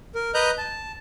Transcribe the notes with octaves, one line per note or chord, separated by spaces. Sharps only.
A#4
B4 D#5 A#5 F#6 G6
A5